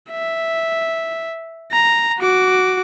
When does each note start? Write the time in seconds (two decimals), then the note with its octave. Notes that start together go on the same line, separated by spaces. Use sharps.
0.11 E5
1.72 A#5
2.19 F#4 D6